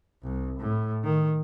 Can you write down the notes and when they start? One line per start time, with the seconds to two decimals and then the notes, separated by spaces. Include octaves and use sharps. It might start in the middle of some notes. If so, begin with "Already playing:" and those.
0.23 C2
0.60 A2
1.04 D#3